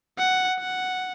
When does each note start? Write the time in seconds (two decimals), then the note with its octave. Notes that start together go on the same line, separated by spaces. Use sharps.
0.18 F#5
0.59 F#5